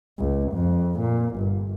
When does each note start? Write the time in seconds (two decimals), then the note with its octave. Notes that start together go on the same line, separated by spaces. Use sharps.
0.19 C#2
0.52 F2
1.00 A#2
1.36 G1